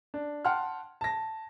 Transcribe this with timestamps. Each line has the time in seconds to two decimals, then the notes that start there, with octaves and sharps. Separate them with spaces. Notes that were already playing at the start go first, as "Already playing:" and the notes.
0.14 D4
0.45 F#5 G5 A5 C6 F6
1.01 A5 A#6